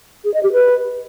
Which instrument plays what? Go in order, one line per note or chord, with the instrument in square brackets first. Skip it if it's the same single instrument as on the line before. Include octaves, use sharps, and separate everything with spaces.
[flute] G#4
D#5
G4
B4